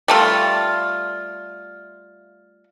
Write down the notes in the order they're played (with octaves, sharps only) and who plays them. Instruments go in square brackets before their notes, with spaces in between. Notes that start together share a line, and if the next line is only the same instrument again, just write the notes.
[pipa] G3 A3 F4